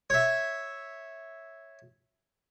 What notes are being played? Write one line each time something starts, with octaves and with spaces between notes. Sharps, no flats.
C#5 E5